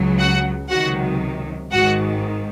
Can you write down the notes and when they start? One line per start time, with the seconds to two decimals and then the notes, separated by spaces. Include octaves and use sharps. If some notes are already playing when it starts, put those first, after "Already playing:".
Already playing: C#2 C#3 F#3
0.19 F#4 F#5
0.70 C#2 C3 D#3 F#3 F#4 F#5
1.72 G#1 G#2 D#3 F#4 F#5